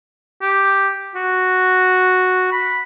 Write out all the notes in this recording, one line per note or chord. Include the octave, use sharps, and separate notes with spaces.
G4
F#4
B5